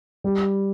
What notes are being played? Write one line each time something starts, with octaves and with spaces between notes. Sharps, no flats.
G3